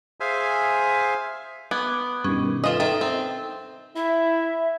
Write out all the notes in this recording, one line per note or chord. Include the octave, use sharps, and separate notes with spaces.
G#4 C5 E5 F5 G#5
B3 D6 F#6 G#6
G2 B2 D#3 C#4
F4 A4 B4 D#5
D#3 D#4 A4 E5 G5
C4
E4 E5